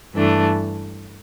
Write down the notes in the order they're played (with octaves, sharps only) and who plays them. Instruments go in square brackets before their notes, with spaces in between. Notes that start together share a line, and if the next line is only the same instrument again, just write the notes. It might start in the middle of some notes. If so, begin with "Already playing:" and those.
[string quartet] G2 E3 A3 D4